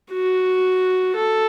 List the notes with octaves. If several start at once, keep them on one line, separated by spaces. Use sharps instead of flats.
F#4
A4